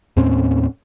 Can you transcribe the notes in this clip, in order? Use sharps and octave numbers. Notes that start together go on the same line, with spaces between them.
D#2 A2 C4 C#4